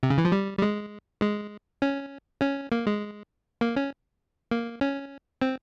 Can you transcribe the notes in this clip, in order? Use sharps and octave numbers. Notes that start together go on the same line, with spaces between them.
C3
C#3
E3
F3
G3
G3
G#3
G#3
C#4
C#4
A#3
G#3
A#3
C#4
A#3
C#4
C4